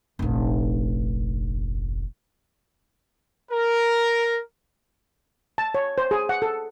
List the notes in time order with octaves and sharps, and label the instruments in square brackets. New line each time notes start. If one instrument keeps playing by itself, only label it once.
[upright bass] F1 A#1
[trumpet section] A#4
[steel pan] A5
C#5
C5
G#4
F#5
A4